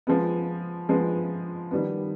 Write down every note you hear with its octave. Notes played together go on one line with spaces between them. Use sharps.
F3 G#3 B3
F3 G#3 B3
D#3 G3 B3